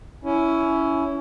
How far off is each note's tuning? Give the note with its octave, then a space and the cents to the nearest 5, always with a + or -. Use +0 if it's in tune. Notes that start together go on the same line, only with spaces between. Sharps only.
C#4 +20 E4 +0